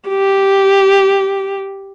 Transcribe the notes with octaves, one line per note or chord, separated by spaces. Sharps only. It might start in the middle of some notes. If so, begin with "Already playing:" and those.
G4